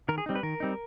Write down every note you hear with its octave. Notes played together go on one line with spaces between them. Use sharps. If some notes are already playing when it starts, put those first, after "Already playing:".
D#3 A#4
G#4
G3 C4 D#4
B4
D#3 A#4
G3 C4 D#4